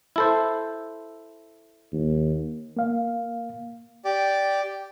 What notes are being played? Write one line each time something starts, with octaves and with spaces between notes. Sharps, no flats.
E4 A4 C5
D#2
A#3 F5
G4 D5